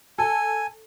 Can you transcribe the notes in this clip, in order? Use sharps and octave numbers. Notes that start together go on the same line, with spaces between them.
A4 G#5